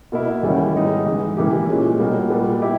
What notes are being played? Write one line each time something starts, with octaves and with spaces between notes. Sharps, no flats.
B2 A#3 E4
E2 D#3 G3 C#4 E4
G#2 G3 B3 D#4
G#2 E3 G#3
E3 A#3 E4 G4
A#2 G#3 C#4
B2 G3 A#3
A#2 G3 B3
E4 G4